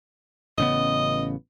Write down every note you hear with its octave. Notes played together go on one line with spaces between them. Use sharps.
A1 C#3 B3 D#5